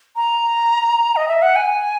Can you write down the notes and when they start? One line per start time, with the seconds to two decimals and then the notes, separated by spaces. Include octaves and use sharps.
0.16 A#5
1.16 D#5
1.28 E5
1.42 F#5
1.56 G#5